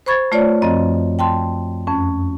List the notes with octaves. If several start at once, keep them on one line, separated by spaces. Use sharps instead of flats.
C5 B5 C#6 G#6 A6
A3 F4 C#5 D5
F#2 F3 C4 D#5
G5 A5 C6
F2 C#4